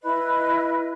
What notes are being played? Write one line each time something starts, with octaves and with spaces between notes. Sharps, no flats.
E4 B4 D#5